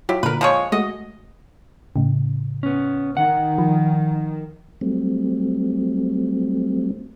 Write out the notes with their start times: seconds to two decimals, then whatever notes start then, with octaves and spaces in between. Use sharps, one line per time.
0.09 F#3 E4 F4 G4
0.23 A#2 D3 A#4 B4
0.41 F3 G#3 C#5
0.72 G#3 A3 F#4 D#5
1.96 A2 C#3
2.63 B3 C#4
3.17 D#3 F#5
3.58 F3
4.81 F#3 G3 A3 C4